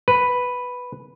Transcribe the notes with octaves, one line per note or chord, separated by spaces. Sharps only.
B4